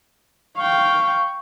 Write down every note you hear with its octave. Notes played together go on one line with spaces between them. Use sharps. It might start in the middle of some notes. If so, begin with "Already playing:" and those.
F5 G5 C#6